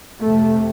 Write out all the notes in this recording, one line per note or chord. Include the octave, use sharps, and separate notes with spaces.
F2 C3 A3